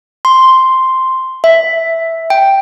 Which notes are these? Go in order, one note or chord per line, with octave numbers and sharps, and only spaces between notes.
C6
E5
G5